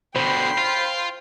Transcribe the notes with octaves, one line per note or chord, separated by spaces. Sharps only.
B2 D3 C5 G5 B5 C7
F4